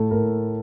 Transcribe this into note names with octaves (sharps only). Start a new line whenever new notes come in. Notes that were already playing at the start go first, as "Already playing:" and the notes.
Already playing: A2 A3 A4
A2 A#4